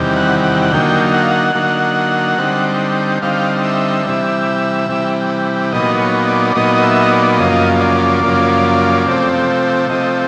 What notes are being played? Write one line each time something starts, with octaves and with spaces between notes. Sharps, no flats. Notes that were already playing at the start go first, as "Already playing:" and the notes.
Already playing: E2 C3 D#3 G3
F#5
F#5
F#5
D3 F#3 A#3 D#4 G5
F#5
F5
F#5
D3 F#3 A#3 D#4
D3 G3 C4 D#4
D3 G3 C4 D#4 F5
E5
C3 E3 G3
C3 E3 G3
A#2 F#3 B3 D#4 D#5
C#5
D5
D5
A#2 F#3 B3 D#4 D#5
D#5
E5
D#5
D5
F#2 C#3 F3 A#3 D#5
D5
F#2 C#3 F3 A#3
C3 F3 A3 C4
C3 F3 A3 C4 D#5